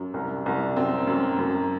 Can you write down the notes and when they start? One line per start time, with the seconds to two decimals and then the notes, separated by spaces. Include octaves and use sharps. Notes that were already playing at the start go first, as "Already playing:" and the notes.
Already playing: F#2
0.14 C2
0.46 C2
0.76 F#2 C4
1.07 F#2
1.39 F#2